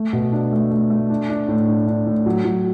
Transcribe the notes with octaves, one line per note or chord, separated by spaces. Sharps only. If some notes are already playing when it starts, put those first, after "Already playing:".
Already playing: A3
B2
D4
A3
A3
A3
D4
D4
A2
D4
D4
A2
F#3
F#3